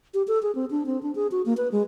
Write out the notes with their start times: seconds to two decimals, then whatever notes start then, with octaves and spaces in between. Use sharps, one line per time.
0.14 G4
0.28 A4
0.43 G#4
0.55 C4
0.71 D4
0.86 C4
1.03 D4
1.15 G#4
1.31 F#4
1.46 A#3
1.57 B4
1.72 G#3